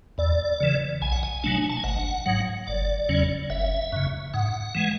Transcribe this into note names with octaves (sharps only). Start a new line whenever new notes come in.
E2 D5
C#3 E3
B1 G#5
F#5
G#5
B2 F#3 A3 D4
A5
G#5
G#1 F#5
G#2 F#3
F#1 D5
E2 C#3 F#3 C#4
F#1 E5
F#2 C#3
G#2 F#5
E3 G#3